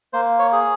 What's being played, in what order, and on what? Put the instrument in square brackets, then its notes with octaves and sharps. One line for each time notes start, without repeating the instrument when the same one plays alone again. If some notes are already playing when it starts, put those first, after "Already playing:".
[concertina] A#3 C5
C#5
G#4